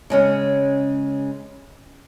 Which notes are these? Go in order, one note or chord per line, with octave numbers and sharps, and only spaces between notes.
C#3 G#3 C#4